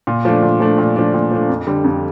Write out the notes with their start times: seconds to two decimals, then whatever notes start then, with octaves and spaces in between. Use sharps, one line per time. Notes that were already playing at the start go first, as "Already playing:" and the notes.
0.07 A#2
0.25 F3 A3 D4
0.43 A#2
0.60 F3 A3 D4
0.78 A#2
0.96 F3 A3 D4
1.14 A#2
1.31 F3 A3 D4
1.49 F2
1.67 D3 G3
1.84 F2